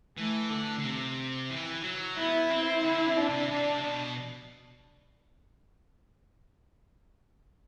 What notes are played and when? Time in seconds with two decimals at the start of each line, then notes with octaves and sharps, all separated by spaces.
0.17 E3 A3
0.50 D3
0.78 D3
0.85 C3
1.50 E3
1.84 F#3
2.17 B3 E4
2.50 C4
2.84 D3 E4
3.06 C3
3.17 D4
3.29 C3
3.51 C3 D4
3.84 B2